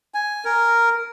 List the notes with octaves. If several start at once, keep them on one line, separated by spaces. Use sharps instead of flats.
G#5
A#4